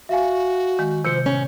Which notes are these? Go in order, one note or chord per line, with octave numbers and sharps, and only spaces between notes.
F#4 E5 F5 G#5
D#3 G#3
C3 F3 C5 G6 C#7
A2 C#4